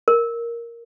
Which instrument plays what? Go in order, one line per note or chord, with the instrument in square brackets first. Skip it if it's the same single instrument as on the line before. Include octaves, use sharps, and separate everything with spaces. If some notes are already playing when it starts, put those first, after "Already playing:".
[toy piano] A#4